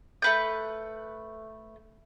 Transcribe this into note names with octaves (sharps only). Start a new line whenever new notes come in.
A3 B4 G6